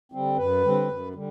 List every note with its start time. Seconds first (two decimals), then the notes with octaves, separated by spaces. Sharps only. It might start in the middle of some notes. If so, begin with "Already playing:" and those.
0.12 D3 G3 C4
0.37 F#2 B4
0.63 D3 G3 C4
0.88 F#2
1.14 D3 G3